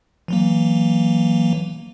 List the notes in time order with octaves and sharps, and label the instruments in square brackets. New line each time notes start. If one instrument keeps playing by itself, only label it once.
[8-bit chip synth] E3 F#3 A#3